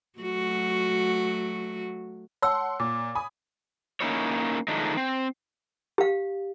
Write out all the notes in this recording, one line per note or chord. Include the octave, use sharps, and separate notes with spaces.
F#3 A3 F#4
C#5 F#5 A5 C6 E6
A#2 D6
G#5 B5 D#6
A#3 C#4 D#4 E4 C#5
D#3 F3 G#3 A3 D4 D#4
C4
G4 F5